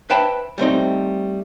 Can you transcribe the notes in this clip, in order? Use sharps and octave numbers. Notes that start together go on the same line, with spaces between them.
B4 C5 E5 G5 A5 B5
G3 A3 C4 D#4